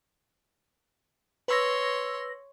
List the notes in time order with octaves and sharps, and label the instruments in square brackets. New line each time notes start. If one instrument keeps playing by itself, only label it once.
[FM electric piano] B4 E6 A#6 [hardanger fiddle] C#5 C6